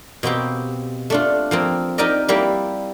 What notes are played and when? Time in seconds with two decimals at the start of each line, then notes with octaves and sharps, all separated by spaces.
0.23 B2 A#3 C4 G4
1.10 A3 D4 F4
1.51 F3 A#3 C4
1.98 D#4 G4 A#4 D5 D#5
2.28 G3 A#3 E4 G4